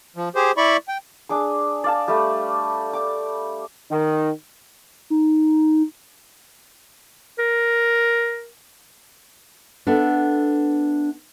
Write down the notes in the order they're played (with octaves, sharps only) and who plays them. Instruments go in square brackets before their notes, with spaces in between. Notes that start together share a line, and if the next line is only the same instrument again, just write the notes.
[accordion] F3
G4 G#4 C5
E4 D5 B5 C#6
G5
[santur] D4 G#4 D6
D5 F5 A5
G3 A3
D6
[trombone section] D#3
[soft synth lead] D#4
[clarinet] A#4
[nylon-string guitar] B3 D4 A4 E5